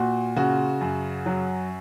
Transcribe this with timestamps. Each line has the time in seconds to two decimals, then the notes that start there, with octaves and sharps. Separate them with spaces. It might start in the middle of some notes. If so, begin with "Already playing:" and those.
Already playing: A#2 F#4
0.36 C#3 F#4
0.81 F#2
1.26 F#3